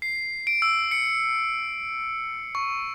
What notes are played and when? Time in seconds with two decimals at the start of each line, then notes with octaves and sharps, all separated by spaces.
0.02 C7
0.47 D7
0.62 E6
0.91 C#7
2.55 C#6